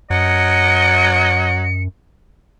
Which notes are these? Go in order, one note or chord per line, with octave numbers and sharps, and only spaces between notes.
F#2 F#3 D#5 C#7